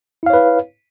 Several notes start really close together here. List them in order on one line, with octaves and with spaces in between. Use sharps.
E4 F5 C#5 B4